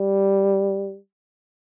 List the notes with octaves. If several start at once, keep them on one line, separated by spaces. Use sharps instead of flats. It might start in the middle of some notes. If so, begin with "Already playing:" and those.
Already playing: G3